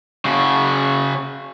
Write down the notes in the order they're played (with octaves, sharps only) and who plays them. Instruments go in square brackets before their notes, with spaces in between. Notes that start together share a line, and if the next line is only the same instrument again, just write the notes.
[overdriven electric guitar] C#3 F#4